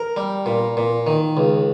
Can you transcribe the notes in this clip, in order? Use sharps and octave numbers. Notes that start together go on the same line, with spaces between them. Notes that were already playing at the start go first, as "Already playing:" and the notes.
Already playing: A#4
G3
A#2
A#2
D#3
C#2